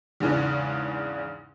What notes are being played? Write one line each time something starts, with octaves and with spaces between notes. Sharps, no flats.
E2 G#2 C#3 E3 D4